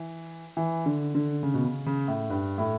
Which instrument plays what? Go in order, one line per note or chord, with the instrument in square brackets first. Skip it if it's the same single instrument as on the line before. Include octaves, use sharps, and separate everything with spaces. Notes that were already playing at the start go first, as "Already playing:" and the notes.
Already playing: [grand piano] E3
E3
D3
D3
C#3
B2
C#3
C#3
A2
G2
A2